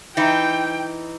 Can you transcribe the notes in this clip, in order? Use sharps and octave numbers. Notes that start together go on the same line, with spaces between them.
E3 D#4 G5